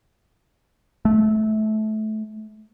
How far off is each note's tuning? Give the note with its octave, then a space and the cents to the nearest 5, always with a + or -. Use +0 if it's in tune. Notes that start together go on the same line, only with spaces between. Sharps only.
A3 -25